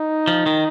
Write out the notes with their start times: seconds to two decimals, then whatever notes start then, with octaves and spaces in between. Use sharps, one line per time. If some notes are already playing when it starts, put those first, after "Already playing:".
Already playing: D#4
0.28 F3
0.46 D#3